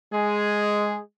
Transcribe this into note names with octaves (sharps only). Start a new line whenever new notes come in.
G#3 G#4